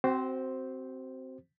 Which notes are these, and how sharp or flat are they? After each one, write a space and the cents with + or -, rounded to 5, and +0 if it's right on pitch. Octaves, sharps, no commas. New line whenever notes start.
C4 -5 F#4 +35 C5 +0